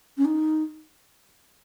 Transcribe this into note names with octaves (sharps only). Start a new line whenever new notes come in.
C#4
D#4